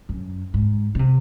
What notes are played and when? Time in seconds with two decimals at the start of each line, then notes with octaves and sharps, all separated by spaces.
0.09 F#2
0.54 G#2
0.95 C#3
0.99 C3